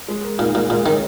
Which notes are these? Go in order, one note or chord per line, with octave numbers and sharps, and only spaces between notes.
G#3
A#4
A#2 D#4
A#2 G#3
A#2 G#3
D#3 C#4